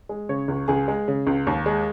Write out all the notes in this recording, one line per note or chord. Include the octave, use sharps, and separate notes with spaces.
G#3
C#3 C#5
C#2
C#2 G#4
G#3
C#3
C#2
D#2
G#3